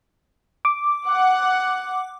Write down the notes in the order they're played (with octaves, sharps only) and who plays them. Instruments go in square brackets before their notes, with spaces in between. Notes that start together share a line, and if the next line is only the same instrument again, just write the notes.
[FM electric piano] D6
[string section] F#5